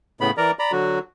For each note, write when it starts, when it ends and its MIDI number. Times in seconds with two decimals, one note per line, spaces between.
0.21 0.31 45
0.21 0.31 49
0.21 0.31 59
0.21 0.31 83
0.37 0.51 52
0.37 0.51 70
0.37 0.51 74
0.37 0.51 82
0.59 0.72 74
0.59 0.72 82
0.59 0.72 83
0.72 0.99 50
0.72 0.99 54
0.72 0.99 66